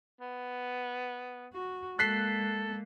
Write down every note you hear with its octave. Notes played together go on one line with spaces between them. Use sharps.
B3
F#4
G#3 A#3 A4 F#6 B6 C7